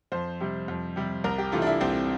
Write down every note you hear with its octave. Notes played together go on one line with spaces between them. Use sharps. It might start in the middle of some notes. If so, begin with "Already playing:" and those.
F2 C5
C3 G3
F2
C3 G3
C2 A#4
G4
C3 E3 A3 F4
D4
E4
C2 C4